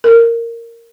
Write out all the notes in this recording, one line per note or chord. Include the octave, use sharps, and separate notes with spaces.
A#4